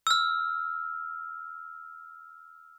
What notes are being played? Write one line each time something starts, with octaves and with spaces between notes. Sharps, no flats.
E6 F6